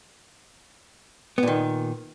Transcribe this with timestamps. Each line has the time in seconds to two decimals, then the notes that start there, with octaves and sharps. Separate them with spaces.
1.38 B3
1.43 A#2
1.48 D#3